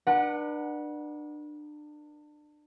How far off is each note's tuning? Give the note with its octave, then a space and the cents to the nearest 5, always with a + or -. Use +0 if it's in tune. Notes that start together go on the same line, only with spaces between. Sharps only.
D4 +30 B4 -35 F#5 +0